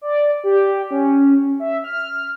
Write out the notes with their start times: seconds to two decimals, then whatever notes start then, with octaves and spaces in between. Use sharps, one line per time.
0.01 D5
0.44 G4
0.91 C#4
1.60 E5
1.84 F6